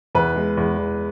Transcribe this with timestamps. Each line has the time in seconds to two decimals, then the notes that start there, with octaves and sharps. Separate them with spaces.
0.15 E2 B4
0.36 G#3
0.57 E2
0.78 E2